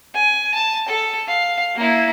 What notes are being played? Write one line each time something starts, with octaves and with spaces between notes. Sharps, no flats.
G#5
A5
A4
F5
A#3 E4